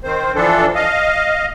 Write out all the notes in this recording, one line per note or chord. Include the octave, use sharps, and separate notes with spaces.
D#3 C4 C5
E3 F3 D4 A4
D#5 F5